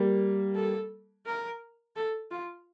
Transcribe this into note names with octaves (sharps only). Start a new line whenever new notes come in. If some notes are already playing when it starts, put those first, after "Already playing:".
Already playing: G3 A#3
A4
A#4
A4
F4